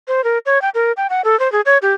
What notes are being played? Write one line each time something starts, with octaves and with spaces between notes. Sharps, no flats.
C5
A#4
C#5
G5
A#4
G5
F#5
A4
C5
G#4
C#5
G4